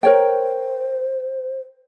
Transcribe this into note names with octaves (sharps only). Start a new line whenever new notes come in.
A#4 C5 C#5 G5